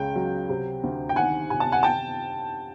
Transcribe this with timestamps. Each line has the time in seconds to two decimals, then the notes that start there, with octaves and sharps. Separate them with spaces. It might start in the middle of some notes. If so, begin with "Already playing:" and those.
Already playing: C#2 C#3 G5
0.16 F#3
0.49 C3
0.83 D2
1.09 G5
1.16 D#3 F#5 G#5
1.50 C3 G#5
1.60 A5
1.72 F#5 G#5
1.83 G5 A5